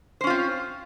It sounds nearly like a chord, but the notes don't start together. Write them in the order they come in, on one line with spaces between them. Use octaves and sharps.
C5 C#4 F4 C4